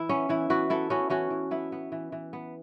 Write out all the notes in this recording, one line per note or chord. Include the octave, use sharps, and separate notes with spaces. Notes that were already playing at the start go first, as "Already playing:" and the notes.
Already playing: E3 E4
B3 C#4
E3 E4
E3 F#4 B4
B3 E4 A4
B3 C#4 F#4
E3 C#4 F#4
E3
B3 E4
B3
E3
E3
B3